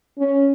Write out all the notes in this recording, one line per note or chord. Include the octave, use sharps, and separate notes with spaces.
C#4